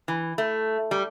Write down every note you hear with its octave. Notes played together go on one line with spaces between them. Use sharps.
E3
A3
G3